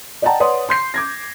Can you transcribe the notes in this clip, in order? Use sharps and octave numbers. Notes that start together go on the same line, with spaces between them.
D5 D#5 F#5 G5 A5 A#5
B4 C#5 D5 F#5 C6 D#6
C6 G6 C7
D6 G#6 A#6